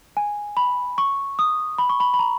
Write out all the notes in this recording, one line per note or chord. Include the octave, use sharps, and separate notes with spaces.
G#5
B5
C#6
D#6
B5
C#6
B5
B5
A#5